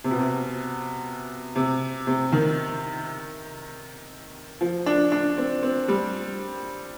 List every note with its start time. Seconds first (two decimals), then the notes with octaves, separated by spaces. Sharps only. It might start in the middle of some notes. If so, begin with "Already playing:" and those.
0.04 C3
0.11 B2
0.19 C3
1.55 C3
2.07 C3
2.32 D#3
4.61 F3
4.86 D4
5.12 D4
5.38 C4
5.63 C4
5.88 G3